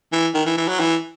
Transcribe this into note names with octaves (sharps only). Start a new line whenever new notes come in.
E3
D#3
E3
E3
F#3
E3